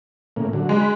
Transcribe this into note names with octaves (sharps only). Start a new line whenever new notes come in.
A2 C#3 A#3
D3 F#3
G#3
B5